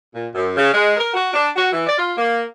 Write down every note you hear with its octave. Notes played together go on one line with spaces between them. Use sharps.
A#2
F#2
C#3
G#3
A#4
F#4
D4
F#4
E3
D5
F4
A#3